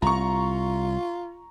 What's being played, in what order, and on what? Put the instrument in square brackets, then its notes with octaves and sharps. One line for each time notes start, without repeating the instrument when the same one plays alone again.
[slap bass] C2 [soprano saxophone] F4 [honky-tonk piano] A#5 C#6